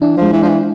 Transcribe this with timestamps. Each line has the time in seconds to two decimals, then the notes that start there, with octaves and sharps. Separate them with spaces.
0.01 E3 D4
0.17 F3
0.22 G#3
0.33 E3
0.43 F3 D4
0.48 E3